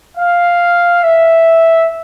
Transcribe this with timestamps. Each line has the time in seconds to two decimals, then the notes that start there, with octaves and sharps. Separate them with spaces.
0.17 F5
1.03 E5